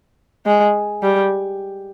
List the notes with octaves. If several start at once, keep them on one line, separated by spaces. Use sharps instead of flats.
G#3
G3